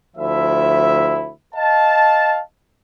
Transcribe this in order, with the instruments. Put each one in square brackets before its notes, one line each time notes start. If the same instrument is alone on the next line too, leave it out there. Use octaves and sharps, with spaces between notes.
[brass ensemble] D2 F3 E4 E5
D#5 F5 A5